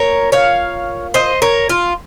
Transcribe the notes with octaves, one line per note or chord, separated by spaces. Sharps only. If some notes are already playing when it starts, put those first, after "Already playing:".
Already playing: A#2 A#4 C#5
C#5 F5
C5 D#5
A#4 C#5
F4